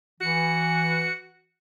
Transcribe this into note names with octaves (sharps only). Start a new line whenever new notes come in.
E3 F#4 C#7